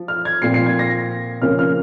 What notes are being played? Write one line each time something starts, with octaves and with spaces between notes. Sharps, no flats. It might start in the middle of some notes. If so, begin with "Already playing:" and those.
Already playing: F3
F6
G#6
A#2 F3 C4 C7
C7
G#6
A#6
C#3 F3 A#3 C#4 F6
F6